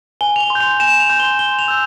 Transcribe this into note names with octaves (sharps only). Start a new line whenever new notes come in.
G#5 G7
F7
G7
C6
G6
F7
G#5 E7
F7
C6 G6
G7
C6 G7
F7
E6 G6